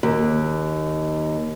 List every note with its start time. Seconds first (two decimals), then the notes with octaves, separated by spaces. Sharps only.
0.03 D#2